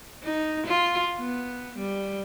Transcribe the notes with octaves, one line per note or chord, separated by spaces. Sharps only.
D#4
F4
B3
G3